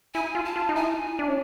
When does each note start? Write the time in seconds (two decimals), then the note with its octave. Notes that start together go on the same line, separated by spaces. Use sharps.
0.14 E4 G#5
0.35 F4
0.45 A5
0.56 F4
0.69 D#4
0.76 E4 G#5
1.19 D4
1.28 C#4